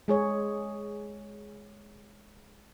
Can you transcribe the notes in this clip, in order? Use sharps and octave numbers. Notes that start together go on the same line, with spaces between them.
G#3 G#4 C#5